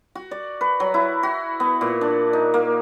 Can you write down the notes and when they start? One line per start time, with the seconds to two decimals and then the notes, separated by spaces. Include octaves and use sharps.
0.15 F#4
0.31 D5
0.61 B4
0.80 F#3
0.94 E4
1.23 F#4
1.60 B3
1.81 A#2
2.01 D4
2.33 D#4
2.54 A#3